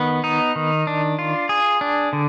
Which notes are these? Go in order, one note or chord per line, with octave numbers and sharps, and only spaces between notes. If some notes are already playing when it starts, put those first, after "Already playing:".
Already playing: D#3 B3
D#4
D#3
D4
F4
G#4
D4
D3